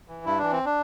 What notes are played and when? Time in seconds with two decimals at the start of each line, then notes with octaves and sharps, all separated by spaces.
0.08 E3
0.25 G2 E4
0.38 E3 D4
0.52 C4
0.66 D4